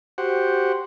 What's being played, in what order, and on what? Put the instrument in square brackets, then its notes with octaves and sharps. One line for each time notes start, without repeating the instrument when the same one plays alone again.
[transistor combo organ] F#4 G4 C5 F#5